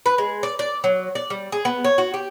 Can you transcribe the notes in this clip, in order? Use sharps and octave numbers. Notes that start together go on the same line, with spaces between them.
B4
G#3
D5
D5
F#3
D5
G3
G#4
B3
C#5
F#4
G4